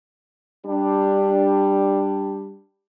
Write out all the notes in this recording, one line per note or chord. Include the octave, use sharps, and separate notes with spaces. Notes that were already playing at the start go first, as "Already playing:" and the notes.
G3 D4